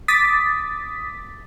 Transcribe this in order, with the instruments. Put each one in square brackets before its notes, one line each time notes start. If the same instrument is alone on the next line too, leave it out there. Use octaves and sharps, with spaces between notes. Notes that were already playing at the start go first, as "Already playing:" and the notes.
[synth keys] D6 D#6 A6 B6